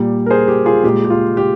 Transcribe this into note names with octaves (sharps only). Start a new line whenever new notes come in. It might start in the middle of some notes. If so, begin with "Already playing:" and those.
Already playing: A#2 G3
A#4
G#4 C5
G4
F4 G#4
A#2 G#3 G4
G4
F4
G4